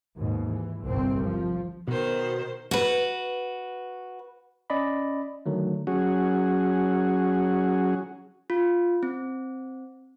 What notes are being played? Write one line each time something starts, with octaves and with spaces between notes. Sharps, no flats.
D#2 G#2 B2
E3
G1 C2 C4
F3
B2 D#3 C5
F#4 B4
C#4 D5 D#5 B5
D3 D#3 F#3 A3
F#3 C#4 F#4 G#4
F4
C4